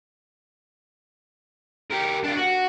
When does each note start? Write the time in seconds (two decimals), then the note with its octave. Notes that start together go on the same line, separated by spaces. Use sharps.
1.91 G4 A#4
2.24 D4 F4
2.36 F#4